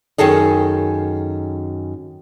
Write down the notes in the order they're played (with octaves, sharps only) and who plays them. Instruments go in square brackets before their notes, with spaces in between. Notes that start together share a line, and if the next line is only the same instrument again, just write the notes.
[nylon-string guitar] F#2 D#3 G#4 A4 D#5